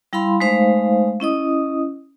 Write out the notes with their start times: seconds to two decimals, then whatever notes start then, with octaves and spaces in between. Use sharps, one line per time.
0.13 G3 E4 F5 B5 C6
0.40 G#3 A3 D#4 C5 F5
1.20 C#4 E4 D#5 D#6